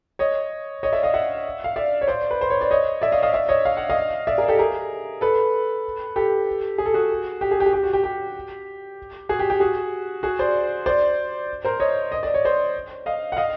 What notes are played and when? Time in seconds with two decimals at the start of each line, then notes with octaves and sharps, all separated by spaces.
0.19 C#5 D#5
0.83 C#5 D#5
0.92 D5 E5
1.03 D#5 F5
1.14 E5 F#5
1.64 F5
1.76 D5 E5
2.01 C#5
2.08 C5 D5
2.31 B4
2.41 C5
2.50 C#5
2.61 D5
2.71 C#5 D#5
3.02 D5 E5
3.12 D#5 F5
3.22 D#5 F5
3.34 D5 E5
3.49 C#5 D#5
3.65 F5
3.77 F#5
3.90 D#5 F5
4.27 D5 E5
4.38 G#4 A#4
4.48 G4 A4
4.59 G#4 A#4
5.21 A4 B4
6.16 G4 A4
6.78 G#4
6.86 A4
6.94 F#4 G#4
7.41 G4
7.51 G#4
7.60 G4
7.66 G#4
7.73 G4
7.83 F#4
7.93 G4
8.04 G4
9.29 F#4 G#4
9.39 G4
9.50 G4
9.60 F#4 G#4
10.23 F#4 G#4
10.39 C5 D5
10.86 C5 D5
11.65 A#4 C5
11.80 C#5 D#5
12.12 D#5
12.23 D5
12.34 C#5
12.45 C5 D5
13.06 D#5 F5
13.32 F#5
13.37 D#5 F5